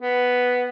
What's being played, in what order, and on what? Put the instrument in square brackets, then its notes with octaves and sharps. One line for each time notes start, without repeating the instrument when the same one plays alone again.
[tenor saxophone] B3